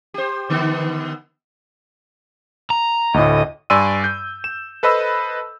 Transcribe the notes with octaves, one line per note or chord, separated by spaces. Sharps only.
G4 C5
D3 D#3 B3
A#5
D2 A2 D#5
G2 D5 G#5 C6 E6 D#7
G6
E7
A4 B4 C5 D#5 B5 E6